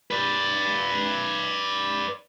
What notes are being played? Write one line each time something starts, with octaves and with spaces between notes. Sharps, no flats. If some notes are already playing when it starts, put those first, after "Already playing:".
B4 D5